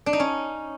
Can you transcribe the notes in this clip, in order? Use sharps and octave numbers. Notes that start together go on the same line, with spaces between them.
D4
D#4
C#4